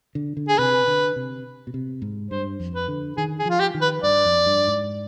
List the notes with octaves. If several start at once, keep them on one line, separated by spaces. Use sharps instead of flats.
D3
D3
G#4
C3 B4
D3
C3
B2
C3
G#2
G2 C5
F2
B4
D3
D#3 G#4
G#4
F3 F4
G4
D#3
B4
G2 D5
F2
G2
G#2